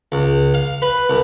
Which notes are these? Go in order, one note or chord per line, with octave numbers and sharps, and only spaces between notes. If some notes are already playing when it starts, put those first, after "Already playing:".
C#2
F5
B4
C2